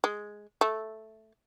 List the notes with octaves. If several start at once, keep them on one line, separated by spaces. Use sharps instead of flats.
G#3
A3